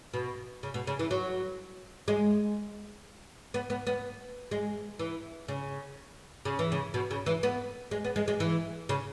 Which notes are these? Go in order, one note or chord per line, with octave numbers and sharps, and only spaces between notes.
B2
C#3
B2
C#3
E3
F#3
G#3
B3
B3
B3
G#3
E3
C#3
C#3
E3
C#3
B2
C#3
E3
B3
G#3
B3
G#3
G#3
E3
C#3